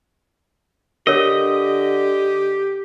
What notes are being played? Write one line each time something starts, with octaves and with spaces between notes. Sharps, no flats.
D3 G4 A#4 C#5 D#5